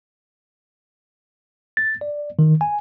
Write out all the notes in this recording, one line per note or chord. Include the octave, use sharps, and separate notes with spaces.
A6
D5
D#3
G#5